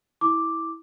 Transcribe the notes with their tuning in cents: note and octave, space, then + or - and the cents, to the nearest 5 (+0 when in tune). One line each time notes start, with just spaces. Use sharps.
E4 -15 D6 +0